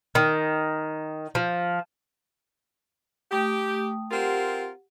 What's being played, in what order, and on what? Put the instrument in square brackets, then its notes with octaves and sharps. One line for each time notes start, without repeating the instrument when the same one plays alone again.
[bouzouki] D#3
F3
[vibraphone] A3 G5 D#6 [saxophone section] G4
[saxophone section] C4 F4 A#4 [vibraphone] G4 F#5